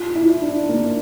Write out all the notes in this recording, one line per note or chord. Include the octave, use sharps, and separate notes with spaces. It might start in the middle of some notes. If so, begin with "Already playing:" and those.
Already playing: F4
E4
D4
A#3